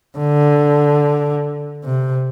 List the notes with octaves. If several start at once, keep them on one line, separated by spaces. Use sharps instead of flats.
D3
C3